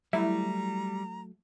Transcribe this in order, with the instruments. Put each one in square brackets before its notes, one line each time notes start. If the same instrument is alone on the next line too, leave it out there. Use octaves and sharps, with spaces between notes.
[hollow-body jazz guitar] F#3 A3 E5 [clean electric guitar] G3 [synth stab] E4 [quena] A#5